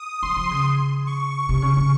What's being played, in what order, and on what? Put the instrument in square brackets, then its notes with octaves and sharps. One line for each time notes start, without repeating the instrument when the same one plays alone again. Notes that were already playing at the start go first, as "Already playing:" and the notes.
Already playing: [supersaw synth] D#6
[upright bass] F3 [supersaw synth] C6
[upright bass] F3
C#3
[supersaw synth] C#6
[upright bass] C3 [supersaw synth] C#6
[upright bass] C#3
C#3